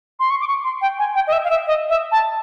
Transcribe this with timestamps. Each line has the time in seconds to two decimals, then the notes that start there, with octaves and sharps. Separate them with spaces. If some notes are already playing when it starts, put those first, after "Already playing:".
0.20 C6
0.30 C#6
0.41 D6
0.48 C#6
0.64 C6
0.81 G5
0.99 G#5
1.15 G5
1.27 D#5
1.32 E5
1.44 F5
1.50 E5
1.67 D#5
1.89 E5
2.12 A5